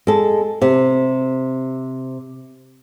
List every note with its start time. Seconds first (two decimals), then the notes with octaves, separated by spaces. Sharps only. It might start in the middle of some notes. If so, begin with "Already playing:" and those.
0.07 G#3 A4
0.62 C3